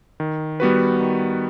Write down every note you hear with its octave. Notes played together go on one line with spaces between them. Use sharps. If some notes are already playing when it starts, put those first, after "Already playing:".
D#3
G3 B3 F#4 B4
D#3